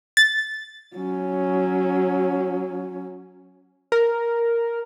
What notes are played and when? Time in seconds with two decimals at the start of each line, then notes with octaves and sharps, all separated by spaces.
0.17 A6
0.95 F#3 C#4
3.92 A#4